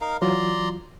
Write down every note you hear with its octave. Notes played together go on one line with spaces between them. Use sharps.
D#4 A#4 F5
E3 F#3 F4 D5 A#5 C6